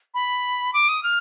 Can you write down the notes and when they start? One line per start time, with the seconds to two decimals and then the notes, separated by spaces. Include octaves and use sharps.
0.14 B5
0.73 D6
0.89 D#6
1.03 F6